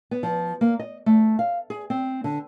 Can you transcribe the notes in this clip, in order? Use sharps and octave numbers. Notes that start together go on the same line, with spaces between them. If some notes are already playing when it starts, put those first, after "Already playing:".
B3
F3
A#3
D#5
A3
F5
G#4
C4
D3